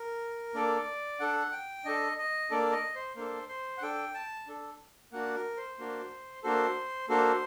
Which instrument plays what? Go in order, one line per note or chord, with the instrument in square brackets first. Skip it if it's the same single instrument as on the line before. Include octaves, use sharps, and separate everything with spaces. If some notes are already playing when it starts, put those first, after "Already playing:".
Already playing: [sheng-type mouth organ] A#4
A#3 D4 A4 D5
D4 A4 F#5
G5
D4 A4 D#5
D#5
A#3 D4 A4 D5
D#5
C5
A#3 D4 A4 C5
C5
F#5
D4 A4 G5
A5
D4 A4
A#3 D4 F#4 F#5
A#4
C5
A#3 D4 F#4
A#3 D4 F#4 A4 C5
A#3 D4 F#4 A4 C5